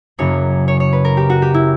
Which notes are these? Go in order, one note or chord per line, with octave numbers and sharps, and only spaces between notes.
F#1 F#2 C#3 F#3 A#3 C#5
C#5
C#5
B4
A#4
G4
F#4
G4
E4